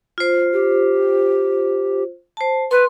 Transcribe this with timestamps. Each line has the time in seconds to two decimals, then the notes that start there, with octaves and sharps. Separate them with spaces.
0.18 F4 C5
0.53 G4
2.37 C5 A5
2.71 B4 C6